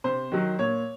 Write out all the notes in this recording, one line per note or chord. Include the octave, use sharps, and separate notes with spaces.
C3 C5
D#3 F#3
A#2 C#5